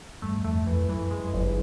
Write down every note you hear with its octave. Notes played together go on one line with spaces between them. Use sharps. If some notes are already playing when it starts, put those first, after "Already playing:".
G2 A3
F2 A3
F2 E3
F#2 E3
G#3
G1